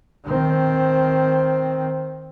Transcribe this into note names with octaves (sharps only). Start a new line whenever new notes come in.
D#3 C4